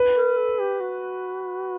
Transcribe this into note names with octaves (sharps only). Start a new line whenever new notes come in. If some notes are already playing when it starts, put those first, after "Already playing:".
Already playing: B4
A#4
A4
G4
F#4